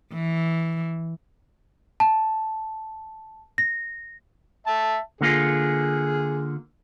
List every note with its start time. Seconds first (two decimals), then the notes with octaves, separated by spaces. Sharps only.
0.13 E3
2.00 A5
3.58 A#6
4.67 E5 A5
5.21 D3 A#3 F4 G#4